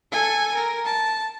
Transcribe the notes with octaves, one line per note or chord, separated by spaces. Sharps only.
A4 G#5
A#4
A5